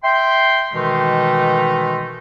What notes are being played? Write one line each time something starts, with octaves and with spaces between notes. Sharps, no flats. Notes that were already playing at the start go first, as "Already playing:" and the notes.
E5 G5 C6
B2 D#3 E3 G#3 A3 D#4